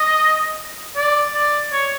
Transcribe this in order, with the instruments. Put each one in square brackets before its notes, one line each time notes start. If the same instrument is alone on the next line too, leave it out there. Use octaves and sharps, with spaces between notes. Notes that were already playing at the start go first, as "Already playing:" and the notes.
Already playing: [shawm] D#5
D5
D5
C#5